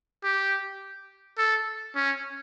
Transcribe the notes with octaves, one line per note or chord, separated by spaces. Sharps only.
G4
A4
C#4